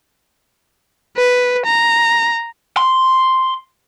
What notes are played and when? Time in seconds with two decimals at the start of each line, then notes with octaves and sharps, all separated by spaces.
1.17 B4
1.66 A#5
2.77 C6